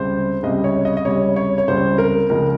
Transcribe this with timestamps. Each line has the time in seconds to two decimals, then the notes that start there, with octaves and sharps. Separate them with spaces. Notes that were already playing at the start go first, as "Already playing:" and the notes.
Already playing: C#2 C3 G3 C5
0.43 C#2 C3 G3 D#5
0.64 C#5
0.85 D#5
0.97 D#5
1.05 C#2 C3 G3 C#5
1.36 C#5
1.58 C#5
1.68 C#2 C3 G3 C5
1.98 A#4
2.30 C#2 C#3 F3 G#3 A#4